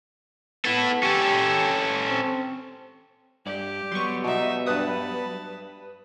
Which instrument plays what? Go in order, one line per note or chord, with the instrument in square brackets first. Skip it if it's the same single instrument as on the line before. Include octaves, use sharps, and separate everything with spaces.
[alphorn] B3 [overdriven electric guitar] E4 A4
[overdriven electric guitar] C#4 A4 [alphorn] G4
[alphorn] C4
[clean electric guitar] G2 D5 [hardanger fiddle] G4
[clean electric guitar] F#3 G3 B3 [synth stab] C6 C#6
[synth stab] B2 [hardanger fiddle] D#4 E5
[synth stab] G2 B4 D#6 [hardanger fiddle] A5 B5